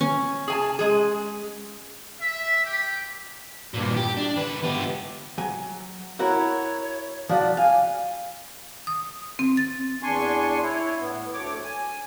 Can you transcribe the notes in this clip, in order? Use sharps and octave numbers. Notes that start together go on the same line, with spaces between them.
C#4
G#4 G#5 A5
G#3 G#4
E5
G4
G2 A#2
G4
D4
D3 B4
B3 G4
F#3 G#5
E4 F#4 A#4 C#5
F3 F#4 D5
F5 G#5
D#6
C4
A6
E2 D4 G#5 C6 C#6
E4 C#5
A2 B3
D2 A3 C#5 D6
G#5